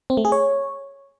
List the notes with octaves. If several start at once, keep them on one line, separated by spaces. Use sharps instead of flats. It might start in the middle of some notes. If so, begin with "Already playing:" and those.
C4
A3
G#4
C#5